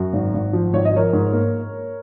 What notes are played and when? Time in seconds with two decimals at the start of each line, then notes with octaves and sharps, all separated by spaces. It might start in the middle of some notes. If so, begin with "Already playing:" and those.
Already playing: F#2 F#4
0.13 G#1
0.34 G#1
0.53 F3
0.73 G#1 C#5
0.85 D#5
0.93 F3 A#4 C#5
1.13 G#2
1.33 A#3